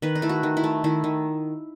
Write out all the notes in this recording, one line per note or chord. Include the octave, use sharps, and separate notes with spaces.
D#3 B4
D#4
A3 E4
F#4
D#3
E4
A3
D#3 E4
D#3